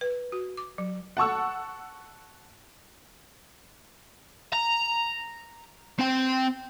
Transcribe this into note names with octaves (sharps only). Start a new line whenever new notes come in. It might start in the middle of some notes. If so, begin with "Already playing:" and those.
B4
F#4
D6
F#3
F#5 A5 C#6 E6
A#5
C4 G5